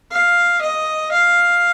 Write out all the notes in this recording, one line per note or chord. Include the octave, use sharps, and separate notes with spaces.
F5
D#5
F5